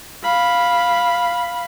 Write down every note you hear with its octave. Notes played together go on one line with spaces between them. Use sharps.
F5 B5